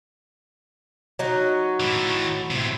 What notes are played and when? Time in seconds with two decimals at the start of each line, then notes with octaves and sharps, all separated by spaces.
1.19 F#3 D#4 F#4
1.80 A2 E3
2.51 A2 C3